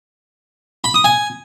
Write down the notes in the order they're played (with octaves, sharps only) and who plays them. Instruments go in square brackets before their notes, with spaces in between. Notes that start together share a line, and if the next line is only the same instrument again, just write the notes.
[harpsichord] B5
D#6
G#5